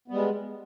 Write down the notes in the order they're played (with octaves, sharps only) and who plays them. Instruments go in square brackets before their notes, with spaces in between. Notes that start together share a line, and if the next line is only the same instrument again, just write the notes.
[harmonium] B3
G3
G#3